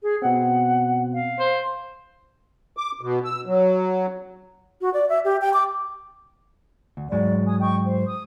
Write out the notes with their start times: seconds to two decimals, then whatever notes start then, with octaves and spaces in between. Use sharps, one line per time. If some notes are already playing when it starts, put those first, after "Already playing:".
0.03 G#4
0.22 B2 C4 F#5
1.14 F5
1.39 C5
2.77 D6
3.01 B2
3.25 E6
3.46 F#3
4.81 F#4
4.94 D5
5.09 E5
5.25 G4
5.41 G5
5.54 D6
6.97 D2
7.12 G#2 F#3 G#3 D5
7.46 G#5 D#6
7.60 D#5 G5 C#6
7.84 C5
8.05 D#6